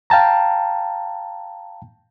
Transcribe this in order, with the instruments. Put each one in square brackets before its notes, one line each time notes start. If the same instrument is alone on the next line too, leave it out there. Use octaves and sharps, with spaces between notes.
[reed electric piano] F5 G5 A5 A#5